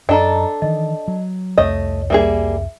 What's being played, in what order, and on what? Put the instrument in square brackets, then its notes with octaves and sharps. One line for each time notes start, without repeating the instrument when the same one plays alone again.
[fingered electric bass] F#2 [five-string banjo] D4 A4 [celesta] D#5 A5 A#5
[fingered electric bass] D#3 E3 [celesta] D#5
[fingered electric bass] F#3
[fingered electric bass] C2 F2 [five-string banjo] A3 D#5 [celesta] C#5
[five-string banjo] G3 A#3 G#4 [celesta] E5